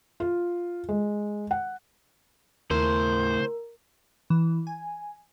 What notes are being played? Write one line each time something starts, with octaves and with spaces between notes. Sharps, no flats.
F4
G#3
F#5
D#2 C#3 A3 E4 A#4 C5
E3
G#5